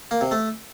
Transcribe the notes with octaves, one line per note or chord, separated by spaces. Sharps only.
A#3
C3
A3